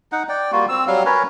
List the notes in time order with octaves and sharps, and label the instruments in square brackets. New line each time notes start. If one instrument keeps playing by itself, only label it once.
[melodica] D#4 F#5
D5 G5
G3 A#3 F4 F#4
C4 E6
F#3 G3 F5
C#4 A#4 B4 C#5